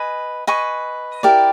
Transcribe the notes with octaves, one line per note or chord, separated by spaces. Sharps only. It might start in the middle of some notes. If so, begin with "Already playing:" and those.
Already playing: B4 D#5 G#5
B4 D#5 G#5 C#6
E4 G4 A#4 D5